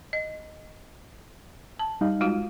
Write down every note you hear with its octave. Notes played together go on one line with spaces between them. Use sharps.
D#5
A5
G3 D#4 F5
G#3 F4 F#4